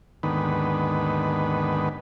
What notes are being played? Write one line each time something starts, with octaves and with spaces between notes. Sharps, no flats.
D#2 G#2 D3 D#3 B3 B4